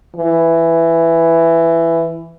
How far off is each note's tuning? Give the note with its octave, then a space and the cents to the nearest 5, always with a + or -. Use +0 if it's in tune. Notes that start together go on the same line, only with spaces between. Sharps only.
E3 +10